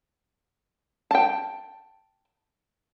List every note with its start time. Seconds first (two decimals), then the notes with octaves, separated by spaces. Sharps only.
1.11 G5 A5